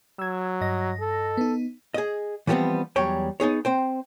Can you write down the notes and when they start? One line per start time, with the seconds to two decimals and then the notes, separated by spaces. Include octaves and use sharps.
0.19 F#3 E6 G#6
0.61 G2 D#5 A#6
1.00 A4
1.37 B3 D#4
1.94 G#4 D#5
2.47 E3 F3 G3 A3 B3 C4
2.96 E2 F#3 G3 C#5 G5
3.40 B3 D#4 G#4 C#5
3.65 C4 C5 G5